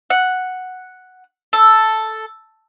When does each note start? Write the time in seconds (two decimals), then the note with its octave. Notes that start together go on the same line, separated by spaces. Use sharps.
0.10 F#5
1.53 A4